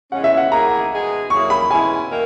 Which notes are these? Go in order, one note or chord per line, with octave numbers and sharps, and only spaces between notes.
E2 C#3 G#3 C#4 F#5
E5
F#5
D#3 A#3 E4 G#4 A#5
B2 G#3 D#4 G#4
D#3 F#3 A#3 E4 G#4 C#6
B5
E2 B2 G#3 C#4 E4 G#5
D#3 A#3